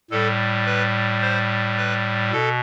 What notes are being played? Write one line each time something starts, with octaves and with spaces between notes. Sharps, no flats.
A2 G3 A4
B4
C5
B4
B2 A4